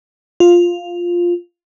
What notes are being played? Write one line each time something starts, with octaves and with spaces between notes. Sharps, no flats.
F4